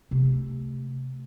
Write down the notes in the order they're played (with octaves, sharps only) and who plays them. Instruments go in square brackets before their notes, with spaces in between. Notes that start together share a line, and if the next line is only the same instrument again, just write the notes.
[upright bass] C3 A3